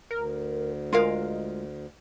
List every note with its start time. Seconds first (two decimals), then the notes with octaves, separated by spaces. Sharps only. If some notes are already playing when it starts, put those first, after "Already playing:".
0.11 D2 A#4
0.92 G#3 F4 A#4 F5